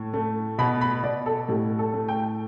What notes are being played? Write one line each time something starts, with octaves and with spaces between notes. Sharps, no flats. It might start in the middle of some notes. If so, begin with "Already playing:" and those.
Already playing: A2
A3
B2 B5
B5
B2 D5
A4
A2 G4
A4
A3
G5